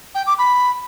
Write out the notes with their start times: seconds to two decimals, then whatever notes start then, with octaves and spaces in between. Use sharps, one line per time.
0.15 G5
0.27 D6
0.39 B5